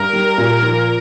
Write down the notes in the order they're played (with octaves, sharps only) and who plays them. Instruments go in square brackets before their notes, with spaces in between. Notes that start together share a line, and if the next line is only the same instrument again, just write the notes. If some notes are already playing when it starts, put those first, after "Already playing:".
Already playing: [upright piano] G2 [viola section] A#4
[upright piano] G3
A#2
F3